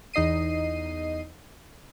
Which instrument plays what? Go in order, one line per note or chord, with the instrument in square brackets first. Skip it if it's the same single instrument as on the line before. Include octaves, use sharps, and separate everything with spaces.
[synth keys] E2 D#4 D#5 C7 D#7